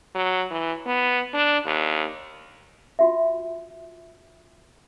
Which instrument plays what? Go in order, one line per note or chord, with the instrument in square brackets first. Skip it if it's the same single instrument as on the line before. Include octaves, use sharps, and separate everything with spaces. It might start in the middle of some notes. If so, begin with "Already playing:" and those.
[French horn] F#3
E3
B3
D4
D#2
[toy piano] F4 F#4 E5